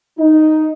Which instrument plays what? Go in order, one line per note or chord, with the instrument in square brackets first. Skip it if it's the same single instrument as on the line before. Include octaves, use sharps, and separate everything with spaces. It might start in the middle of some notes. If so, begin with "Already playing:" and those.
[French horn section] D#4